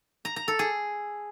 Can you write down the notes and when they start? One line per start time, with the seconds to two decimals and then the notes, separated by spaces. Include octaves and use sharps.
0.25 A#5
0.36 A#5
0.48 A4
0.59 G#4